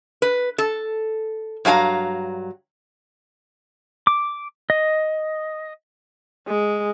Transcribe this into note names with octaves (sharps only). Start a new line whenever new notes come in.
B4
A4
G2 F#3 F5 G#5 A#5
D6
D#5
G#3